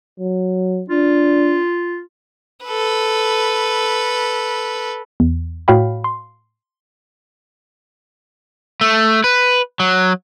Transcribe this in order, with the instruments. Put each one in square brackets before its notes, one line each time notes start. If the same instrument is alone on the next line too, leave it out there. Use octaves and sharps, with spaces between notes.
[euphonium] F#3
[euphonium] D4 [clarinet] F4
[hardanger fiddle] A4 B4
[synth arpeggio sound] E2
A2 F#4 C#5 F5 G5 B5
C6
[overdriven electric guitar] A3
B4
F#3